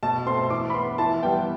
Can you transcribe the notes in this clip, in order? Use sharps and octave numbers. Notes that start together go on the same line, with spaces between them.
B2 A5
A3 C4 C6
C6
E3 D6
B5
B3 C6
E3 A5
G3 B3 G5